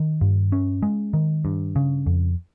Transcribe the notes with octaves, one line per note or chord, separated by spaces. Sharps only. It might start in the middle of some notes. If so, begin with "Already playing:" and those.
Already playing: D#3
G2
C#4
G#3
D#3
G2
C#3
F2